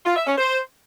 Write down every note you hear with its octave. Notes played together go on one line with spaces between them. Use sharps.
F4
E5
C#4
C5